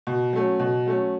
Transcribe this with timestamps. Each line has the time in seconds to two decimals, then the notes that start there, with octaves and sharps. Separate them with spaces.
0.07 B2
0.33 F#3 A3 C#4
0.60 B2
0.86 F#3 A3 C#4